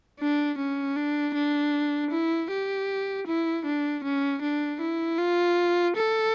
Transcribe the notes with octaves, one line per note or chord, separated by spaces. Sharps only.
D4
C#4
D4
D4
E4
G4
E4
D4
C#4
D4
E4
F4
A4